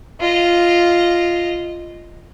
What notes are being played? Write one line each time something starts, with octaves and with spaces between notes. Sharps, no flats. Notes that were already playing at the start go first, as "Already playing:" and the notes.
F4 D#5